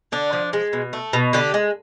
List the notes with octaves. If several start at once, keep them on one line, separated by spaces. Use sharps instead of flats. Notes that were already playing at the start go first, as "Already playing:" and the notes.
D3 D4
F3
G#3
B2
A3
B2
D3 G4
G#3